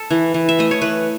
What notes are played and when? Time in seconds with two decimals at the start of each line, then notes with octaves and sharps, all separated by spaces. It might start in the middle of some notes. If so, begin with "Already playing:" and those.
Already playing: A4
0.10 E3
0.34 E3
0.49 E5
0.59 A3 D#5
0.71 C#5
0.82 E3 B4